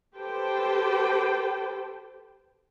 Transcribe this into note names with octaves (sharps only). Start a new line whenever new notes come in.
G4 A4 B4 C5 G5 A5